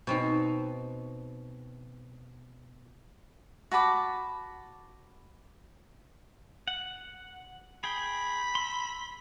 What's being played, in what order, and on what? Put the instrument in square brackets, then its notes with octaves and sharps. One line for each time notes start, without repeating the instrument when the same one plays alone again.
[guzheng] B2 C4 D#4
[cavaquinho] F#4 A5 B5 D6
[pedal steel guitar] F#5
[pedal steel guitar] G#4 G5 [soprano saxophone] B5
[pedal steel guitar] C6 E6